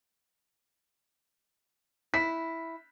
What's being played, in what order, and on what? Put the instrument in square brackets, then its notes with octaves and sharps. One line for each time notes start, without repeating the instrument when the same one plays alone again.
[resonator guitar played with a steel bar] E4 [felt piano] B6